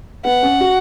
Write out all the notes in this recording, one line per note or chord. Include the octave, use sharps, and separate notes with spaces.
B3 F#5
C#4
F#4